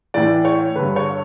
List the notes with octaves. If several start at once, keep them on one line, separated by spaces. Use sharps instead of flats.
A2 E3 D5
C#5
G2 D3 B4
C#5